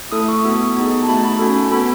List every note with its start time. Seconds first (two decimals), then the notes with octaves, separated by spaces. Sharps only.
0.12 A3 E4 A4 D#6
0.28 C#6
0.45 B3 F#4 A4
0.76 B3 D#4 G#4
1.03 A5
1.08 A3 D#4 F#4 B5
1.24 B5
1.39 C#4 F#4 A4
1.72 B3 F#4 A4 B5